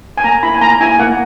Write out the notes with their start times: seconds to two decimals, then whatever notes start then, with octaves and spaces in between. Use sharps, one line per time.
0.17 G#5
0.24 A#3 A#5
0.43 E4 B5
0.54 G#5
0.61 A#3 A#5
0.81 E4 G#5
0.99 A#3 F#5